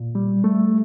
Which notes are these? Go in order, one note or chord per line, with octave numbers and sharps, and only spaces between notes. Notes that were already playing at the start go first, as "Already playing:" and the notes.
Already playing: A#2
G3
A3